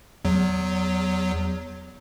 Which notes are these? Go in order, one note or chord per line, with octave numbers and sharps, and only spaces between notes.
E2 F#3